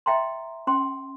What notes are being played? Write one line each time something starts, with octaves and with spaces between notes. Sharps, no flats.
D#5 E5 G5 A#5 C6
C#4 G5 C6